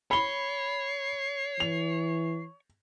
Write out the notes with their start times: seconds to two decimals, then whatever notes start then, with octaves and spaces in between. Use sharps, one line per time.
0.11 C#5 B5 C7 G7
1.60 E3 F7